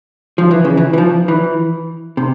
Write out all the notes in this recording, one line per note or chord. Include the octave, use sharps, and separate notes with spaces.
F3
E3
C#3
E3
E3
F3
E3
C3